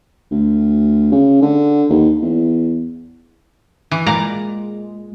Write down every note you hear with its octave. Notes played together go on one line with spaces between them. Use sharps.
D2
C#3
D3
D#2
E2
E3
A#2 G#3 D5 A#5